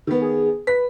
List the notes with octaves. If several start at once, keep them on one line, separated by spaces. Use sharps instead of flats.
D#3 B3
G#4
B4 B6